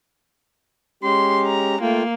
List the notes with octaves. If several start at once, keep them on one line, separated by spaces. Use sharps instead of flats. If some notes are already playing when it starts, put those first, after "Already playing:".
G#3 C#4 G4 C6
A#5
A3 A#3 F4 G5